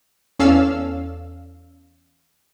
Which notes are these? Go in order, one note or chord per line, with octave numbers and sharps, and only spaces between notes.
E2 C#4 A4 D5 F5 E6